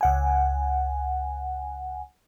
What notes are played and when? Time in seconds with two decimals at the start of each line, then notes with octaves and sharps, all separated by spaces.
0.01 C#2 F#5 G#5